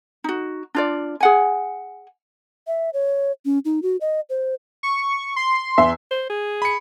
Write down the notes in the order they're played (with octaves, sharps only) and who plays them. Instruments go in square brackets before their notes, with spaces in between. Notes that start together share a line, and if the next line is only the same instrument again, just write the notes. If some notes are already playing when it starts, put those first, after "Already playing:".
[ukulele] D#4 F#4
D4 F4 D5
G#4 F#5 G#5
[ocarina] E5
C#5
C#4
D#4
F#4
D#5
C5
[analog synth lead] C#6
C6
[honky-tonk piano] E2 E5
[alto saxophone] C5
G#4
[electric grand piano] B5 C#7